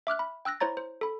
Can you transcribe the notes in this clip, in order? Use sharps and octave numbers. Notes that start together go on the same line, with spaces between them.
E5 D6 F6 F#6
B5
G5 E6 F#6 A#6
E4 C5 C#5 A#5 A6
C5
A4 B5